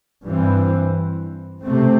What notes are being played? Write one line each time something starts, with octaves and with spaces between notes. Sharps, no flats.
G2 E3 C4
C3 A3 C4